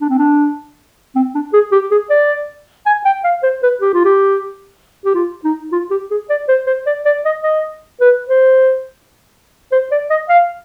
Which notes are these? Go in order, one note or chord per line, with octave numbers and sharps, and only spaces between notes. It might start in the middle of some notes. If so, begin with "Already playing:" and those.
D4
C4
D4
C4
D4
G#4
G4
G#4
D5
G#5
G5
F5
C5
B4
G4
F4
G4
G4
F4
D#4
F4
G4
G#4
D5
C5
C5
D5
D5
D#5
D#5
B4
C5
C5
D5
D#5
F5